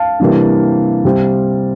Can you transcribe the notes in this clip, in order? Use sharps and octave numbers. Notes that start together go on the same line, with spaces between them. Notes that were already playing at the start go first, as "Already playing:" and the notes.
Already playing: F5 A5
C3 E3 G3 A#3 D4
C3 G3 C4